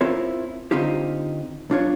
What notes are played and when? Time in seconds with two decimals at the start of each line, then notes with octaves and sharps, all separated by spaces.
0.01 C4 E4 F4 A#4 C#5
0.71 D3 C4 D#4 F4 G4
1.70 B1 D4 F4 C#5